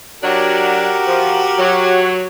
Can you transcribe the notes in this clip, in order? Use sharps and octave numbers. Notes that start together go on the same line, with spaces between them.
F#3 D4 F#4 G4 A#4
F3
F#3